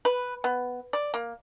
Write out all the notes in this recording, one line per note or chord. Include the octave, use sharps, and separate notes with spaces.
B4
B3
D5
A#3